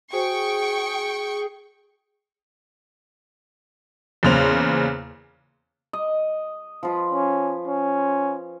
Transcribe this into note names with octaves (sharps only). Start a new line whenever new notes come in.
F#4 G#4 C5 G5 C#6
E2 A#2 C#3 C5 F7
D#5
F3 F4 B4
C#4
C#4